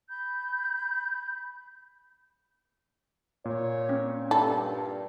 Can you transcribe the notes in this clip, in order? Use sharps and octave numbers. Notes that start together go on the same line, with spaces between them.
B5 G6
A#2 C#5
C4 C#4
G2 D#4 A4 B5 E6